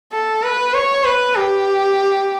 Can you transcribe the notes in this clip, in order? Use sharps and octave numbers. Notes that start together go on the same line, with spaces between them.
A4
B4
C#5
B4
G4